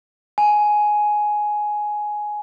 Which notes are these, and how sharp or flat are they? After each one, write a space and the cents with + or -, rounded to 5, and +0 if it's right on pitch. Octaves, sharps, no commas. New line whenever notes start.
G#5 +10